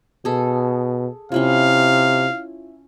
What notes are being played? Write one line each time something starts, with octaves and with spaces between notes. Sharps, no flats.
B2 G#4 A4
C3 C#4 E4 F4 F5